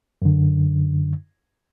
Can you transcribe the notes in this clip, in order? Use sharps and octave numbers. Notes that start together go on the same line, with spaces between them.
F#2 D3